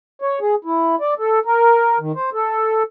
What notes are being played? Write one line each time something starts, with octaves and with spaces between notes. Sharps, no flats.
C#5
G#4
E4
D5
A4
A#4
D#3
C5
A4